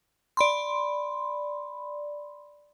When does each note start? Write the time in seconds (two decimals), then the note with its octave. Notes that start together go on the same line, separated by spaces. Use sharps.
0.37 D5 B5 C6